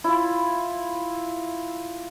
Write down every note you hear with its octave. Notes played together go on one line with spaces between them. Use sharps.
E4 F4